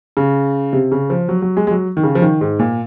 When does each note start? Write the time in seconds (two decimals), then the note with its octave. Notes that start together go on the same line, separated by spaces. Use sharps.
0.17 C#3
0.73 C3
0.92 C#3
1.10 F3
1.29 F#3
1.42 F#3
1.57 G#3
1.67 G#3
1.71 F#3
1.97 D#3
2.03 C#3
2.15 F3
2.22 D#3
2.41 G#2
2.59 A#2